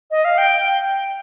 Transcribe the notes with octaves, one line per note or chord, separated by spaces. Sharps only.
D#5
F5
G5